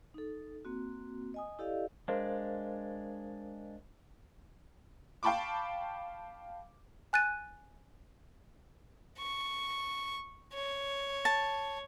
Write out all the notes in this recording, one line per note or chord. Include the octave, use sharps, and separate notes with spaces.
D#4 A4
A#3 C4 F#4
D#5 G#5 D#6
E4 G4 A4 D5 D#5 F5
G#3 D4 A#4 C5 F5
F5 G5 A5 B5 C#6 D6
G#5 F#6 A6 D#7
C#6
C#5
A5